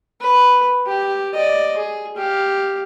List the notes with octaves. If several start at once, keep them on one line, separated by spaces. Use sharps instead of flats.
B4
G4
D5 D#5
G#4
G4 F5